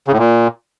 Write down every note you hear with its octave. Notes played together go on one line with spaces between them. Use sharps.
C#3
A2
A#2